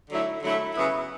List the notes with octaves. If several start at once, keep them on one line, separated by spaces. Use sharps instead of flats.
D3 F#3 A3 E4
D3 F#3 A3 E4
C#3 F#3 B3 E4